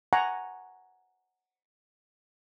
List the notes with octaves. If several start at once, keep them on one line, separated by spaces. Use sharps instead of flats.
F#5 G#5 A#5 C#6